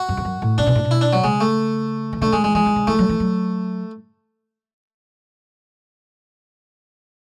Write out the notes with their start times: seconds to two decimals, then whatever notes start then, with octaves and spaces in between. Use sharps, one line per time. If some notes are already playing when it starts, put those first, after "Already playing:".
Already playing: F#4
0.09 F#2
0.17 E2
0.25 F#2
0.42 A2
0.58 C#3 D4
0.67 B2
0.75 A2
0.85 B2
0.91 E4
1.01 D4
1.13 F#3
1.24 C#3 G#3
1.41 A3
2.13 E3
2.21 D3 A3
2.33 D3 G#3
2.44 E3 G#3
2.55 E3 G#3
2.66 E3
2.76 D3
2.87 E3 A3
2.99 F#3
3.09 E3
3.20 F#3